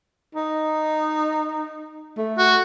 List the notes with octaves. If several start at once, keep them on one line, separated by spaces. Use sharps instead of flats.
D#4
A3
F#4